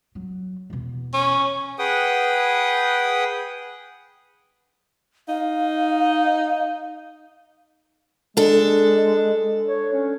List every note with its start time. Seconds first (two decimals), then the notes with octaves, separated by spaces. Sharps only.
0.15 F#3
0.70 E2 B2
1.14 C#4
1.79 G#4 B4 F#5 G5 D#6
5.28 D#4 F5
8.37 G#3 D4 A4
9.67 C#5
9.93 C#4